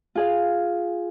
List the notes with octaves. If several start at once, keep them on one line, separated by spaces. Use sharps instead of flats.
F4 G#4 F5